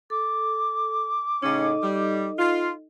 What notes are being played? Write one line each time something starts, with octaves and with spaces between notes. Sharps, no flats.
A4 D6
A2 C#3 C#4 D#4 A4 D#5
G3
F4